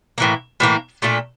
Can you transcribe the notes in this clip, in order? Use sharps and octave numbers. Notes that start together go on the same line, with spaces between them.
A2 E3 A#3
A2 E3 A#3
A#2 A3 D4 A4